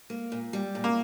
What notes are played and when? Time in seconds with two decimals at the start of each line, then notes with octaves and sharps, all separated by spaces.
0.10 A#3
0.32 A#2
0.53 G3
0.75 A#2
0.84 A#3